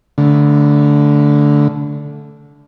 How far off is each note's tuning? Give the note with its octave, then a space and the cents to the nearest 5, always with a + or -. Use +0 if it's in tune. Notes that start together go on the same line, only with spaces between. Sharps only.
D3 -15 A3 -15